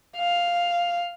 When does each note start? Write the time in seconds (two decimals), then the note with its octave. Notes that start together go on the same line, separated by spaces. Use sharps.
0.17 F5